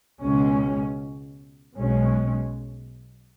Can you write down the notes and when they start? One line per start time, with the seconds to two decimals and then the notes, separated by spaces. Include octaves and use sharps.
0.21 C#2 B2 G#3 C#4
1.75 B1 B2 G#3 C#4